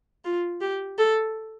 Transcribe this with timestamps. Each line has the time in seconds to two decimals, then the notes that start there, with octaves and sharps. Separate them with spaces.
0.25 F4
0.61 G4
0.98 A4